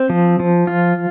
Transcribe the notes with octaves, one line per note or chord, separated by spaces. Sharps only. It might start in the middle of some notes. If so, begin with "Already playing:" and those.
Already playing: C4
F3
F3
F4